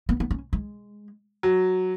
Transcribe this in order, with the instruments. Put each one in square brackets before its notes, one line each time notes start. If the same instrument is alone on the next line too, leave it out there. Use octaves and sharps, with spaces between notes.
[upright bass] B3
B3
C#4
G#3
[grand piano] F#3